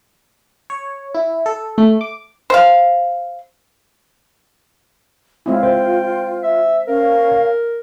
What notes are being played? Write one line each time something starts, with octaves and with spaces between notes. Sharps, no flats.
C#5
E4
A4
A3
D6
C5 F5
G#3 C4 E4 F4
C5 G5
E5
C#4 A#4 F5